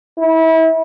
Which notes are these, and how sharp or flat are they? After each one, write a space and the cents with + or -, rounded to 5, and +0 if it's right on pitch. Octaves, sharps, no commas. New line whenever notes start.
E4 -30